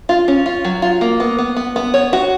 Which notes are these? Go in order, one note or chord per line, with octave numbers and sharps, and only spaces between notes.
F4
C#4
F4
F#3
F4
A#3
B3
B3
B3
B3
C#5
F#4